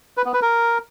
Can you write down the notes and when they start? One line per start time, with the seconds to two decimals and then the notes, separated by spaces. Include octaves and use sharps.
0.17 B4
0.25 B3
0.34 B4
0.42 A#4